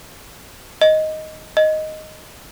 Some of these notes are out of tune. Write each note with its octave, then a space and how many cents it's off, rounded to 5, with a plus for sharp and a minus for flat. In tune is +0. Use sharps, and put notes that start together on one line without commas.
D#5 +5
D#5 +0